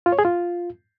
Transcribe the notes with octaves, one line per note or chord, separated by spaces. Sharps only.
F4
C#5
G#4
F4